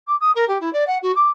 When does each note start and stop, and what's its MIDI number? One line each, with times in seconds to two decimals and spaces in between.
0.07 0.15 86
0.20 0.31 87
0.35 0.45 70
0.48 0.58 67
0.61 0.72 64
0.73 0.84 74
0.87 0.98 78
1.02 1.12 66
1.15 1.29 86